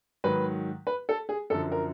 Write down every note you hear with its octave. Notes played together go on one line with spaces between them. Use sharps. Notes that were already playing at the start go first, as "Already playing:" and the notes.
G#2 D#3 F#3 B4
B4
A4
G#4
F#2 D3 F3 A4
A#4